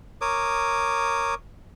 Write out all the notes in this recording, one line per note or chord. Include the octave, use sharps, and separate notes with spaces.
A#4 C#5 D6 D#6